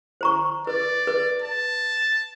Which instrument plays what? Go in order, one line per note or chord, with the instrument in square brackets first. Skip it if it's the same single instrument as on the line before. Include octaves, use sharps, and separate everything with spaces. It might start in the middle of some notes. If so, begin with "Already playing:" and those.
[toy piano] C5 A#5 C#6
[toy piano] B4 [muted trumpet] D5
[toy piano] B4
[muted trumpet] A5